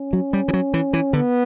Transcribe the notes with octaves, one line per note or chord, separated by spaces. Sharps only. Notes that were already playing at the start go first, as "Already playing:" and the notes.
Already playing: C#4
F#3
G3
E3
F#3
E3
E3
D3 B3